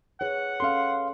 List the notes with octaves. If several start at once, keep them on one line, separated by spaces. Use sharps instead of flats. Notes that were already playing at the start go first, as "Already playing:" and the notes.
G#4 B4 C#5 F#5
C#4 A4 F5 C6